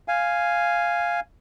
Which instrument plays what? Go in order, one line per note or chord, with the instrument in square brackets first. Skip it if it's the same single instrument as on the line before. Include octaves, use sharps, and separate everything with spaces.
[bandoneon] F5 G#5